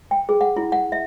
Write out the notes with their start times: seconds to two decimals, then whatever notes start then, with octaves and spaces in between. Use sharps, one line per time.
0.11 G5
0.29 G#4
0.41 F#5
0.56 E4
0.72 F#5
0.92 E5